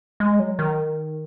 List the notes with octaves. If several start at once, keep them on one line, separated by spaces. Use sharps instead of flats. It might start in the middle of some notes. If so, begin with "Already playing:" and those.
G#3
F#3
D#3